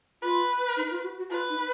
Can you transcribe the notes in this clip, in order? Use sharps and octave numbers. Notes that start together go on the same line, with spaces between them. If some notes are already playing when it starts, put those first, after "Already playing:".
F4 B4
D#4
F4
F#4
F#4
F4 B4
D#4